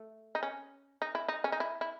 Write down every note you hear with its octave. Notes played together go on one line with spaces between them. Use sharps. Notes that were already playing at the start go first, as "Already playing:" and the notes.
Already playing: A3
D#4
C#4
D#4
E4
D#4
C#4
D#4
E4
E4